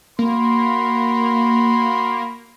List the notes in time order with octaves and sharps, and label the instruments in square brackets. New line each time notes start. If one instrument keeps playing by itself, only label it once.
[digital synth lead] A#3 [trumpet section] F#4 B5 C6